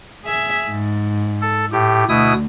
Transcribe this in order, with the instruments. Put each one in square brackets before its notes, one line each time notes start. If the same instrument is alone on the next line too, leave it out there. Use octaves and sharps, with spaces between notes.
[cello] G#4 E5
G#2
[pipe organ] A4
A2 G4
[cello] D2 [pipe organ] B2 E4 D#6